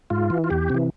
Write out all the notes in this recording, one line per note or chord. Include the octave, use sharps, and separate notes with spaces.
G#2 F4
E3
F4
E2 G4
C3 E3